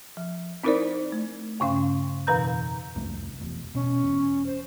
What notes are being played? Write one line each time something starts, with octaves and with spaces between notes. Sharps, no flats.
F3
C4 D#4 E4 A#4 C5 D5
A3
G2 C#3 C#4 F5
F2 B2 E3 B4 A#5 G6
C2 F2 A3
E1
B2 C#4
E1
C5